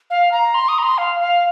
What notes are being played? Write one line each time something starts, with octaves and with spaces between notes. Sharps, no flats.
F5
A#5
C6
D#6
A#5
C6
F5
F5